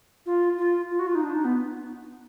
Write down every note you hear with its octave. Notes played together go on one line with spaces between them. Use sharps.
F4
F4
F4
F#4
F4
D#4
D4
D#4
B3